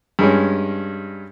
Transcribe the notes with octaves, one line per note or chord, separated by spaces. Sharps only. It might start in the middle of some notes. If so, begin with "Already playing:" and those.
G2 G#3 C#4